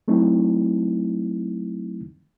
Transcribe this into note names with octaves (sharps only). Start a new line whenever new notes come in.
F#3 A3 C4 D#4 E4